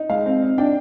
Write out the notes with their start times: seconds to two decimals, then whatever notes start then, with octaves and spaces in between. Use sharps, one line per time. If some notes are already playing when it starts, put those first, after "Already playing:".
Already playing: D#4
0.10 G#3 F5
0.26 C4
0.42 D#4
0.58 D4 G5